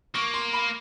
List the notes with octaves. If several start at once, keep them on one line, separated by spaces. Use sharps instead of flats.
A#3 C#6
C6
B5